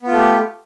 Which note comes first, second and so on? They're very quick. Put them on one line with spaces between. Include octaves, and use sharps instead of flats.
B3 F4 A3 G4